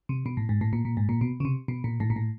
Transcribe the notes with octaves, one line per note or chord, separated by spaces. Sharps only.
C3
B2
A2
G#2
A2
A#2
A#2
G#2
A#2
B2
C#3
C3
B2
A#2
A2
A#2
A2